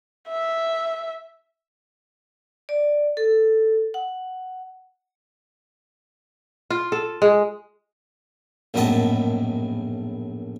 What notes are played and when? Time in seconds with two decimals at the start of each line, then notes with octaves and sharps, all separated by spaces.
0.29 E5
2.69 D5
3.17 A4
3.94 F#5
6.70 F4
6.92 A4
7.22 G#3
8.74 A#1 F#2 A2 B3 D#5 A5